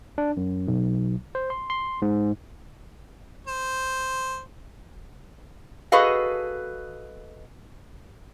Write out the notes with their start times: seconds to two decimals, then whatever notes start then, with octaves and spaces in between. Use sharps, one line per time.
0.18 D4
0.37 F#2
0.68 B1
1.35 C5
1.50 C6
1.70 C6
2.02 G#2
3.47 C5
5.92 F#4 G#4 A4 B4 D#5 F5